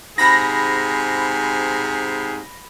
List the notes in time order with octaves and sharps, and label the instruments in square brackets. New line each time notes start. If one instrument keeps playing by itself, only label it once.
[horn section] G#2 C3 G#4 [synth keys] B5 A#6